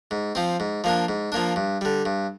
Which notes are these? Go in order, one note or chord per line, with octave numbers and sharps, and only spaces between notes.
G#2
F3 C4
G#2
F3 A#3 D4
G#2
F3 A#3 D4
G2
D3 G3
G2